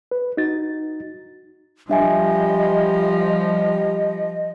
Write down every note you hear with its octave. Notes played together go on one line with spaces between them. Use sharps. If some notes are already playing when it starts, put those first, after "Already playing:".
B4
D#4 F#4 A6
F3 G3 D4 D#5 E5 G#5